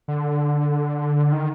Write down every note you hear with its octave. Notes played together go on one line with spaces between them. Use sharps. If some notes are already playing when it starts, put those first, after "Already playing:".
D3
D#3